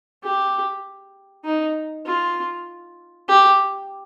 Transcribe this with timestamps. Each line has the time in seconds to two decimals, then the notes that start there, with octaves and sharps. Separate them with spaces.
0.24 G4
1.45 D#4
2.06 F4
3.28 G4